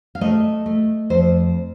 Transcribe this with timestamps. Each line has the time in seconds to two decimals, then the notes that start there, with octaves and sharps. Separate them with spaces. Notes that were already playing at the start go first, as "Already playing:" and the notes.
0.15 F5
0.21 A3 D#5
0.66 A3
1.10 F2 C5